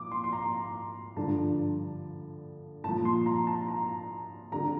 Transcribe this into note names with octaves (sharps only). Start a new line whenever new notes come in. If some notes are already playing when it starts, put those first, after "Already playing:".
Already playing: A#2 F3 D6
C6
C6
A#5
G2 D3 F3 A5
A#2 F3 A5
C6
A#5
A5
A#5
F2 D3 G3 A#5